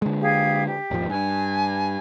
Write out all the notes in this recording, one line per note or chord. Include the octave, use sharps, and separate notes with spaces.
D3 G#3
G4 G#4 F5
G4
G#1 D#2 F3
G2 G#5